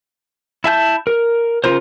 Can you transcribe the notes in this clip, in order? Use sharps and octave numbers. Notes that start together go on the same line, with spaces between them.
E4 E5 A5 G6
A#4
C#3 C4 F4 A#4 C5